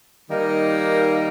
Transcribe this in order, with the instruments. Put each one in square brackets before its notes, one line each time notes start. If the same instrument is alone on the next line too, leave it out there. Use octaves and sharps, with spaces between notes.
[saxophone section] D#3 G3 A#3 D#4